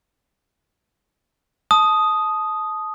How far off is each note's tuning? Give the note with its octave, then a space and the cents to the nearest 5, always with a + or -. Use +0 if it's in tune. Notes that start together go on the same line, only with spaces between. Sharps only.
A5 -20 D#6 +0